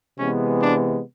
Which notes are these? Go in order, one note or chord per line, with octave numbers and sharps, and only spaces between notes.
C3 E3 G#3 B3 C#4
D4